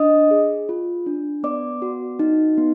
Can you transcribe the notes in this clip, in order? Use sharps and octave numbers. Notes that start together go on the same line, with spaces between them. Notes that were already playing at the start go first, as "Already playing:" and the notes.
Already playing: D4 D#5 D#6
G#4
F4
D4
B3 D5 D6
F#4
D#4
B3